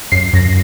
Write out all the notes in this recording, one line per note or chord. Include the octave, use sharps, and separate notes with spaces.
F#2 C7
F#2 A#6